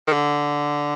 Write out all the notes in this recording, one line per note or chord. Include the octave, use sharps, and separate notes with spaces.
D#3
D3